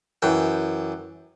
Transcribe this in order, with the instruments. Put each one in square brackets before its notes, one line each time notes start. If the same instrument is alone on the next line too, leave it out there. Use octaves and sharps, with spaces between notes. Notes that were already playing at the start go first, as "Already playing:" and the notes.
[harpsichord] F#2 E3 G5